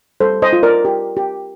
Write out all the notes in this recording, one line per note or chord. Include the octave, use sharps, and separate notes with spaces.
G3 A4 C5
C5 D#5
F4
A#4 D5
G4
G4